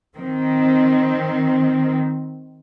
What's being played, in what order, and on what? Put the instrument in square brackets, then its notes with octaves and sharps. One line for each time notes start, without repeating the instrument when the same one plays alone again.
[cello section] D#3 C4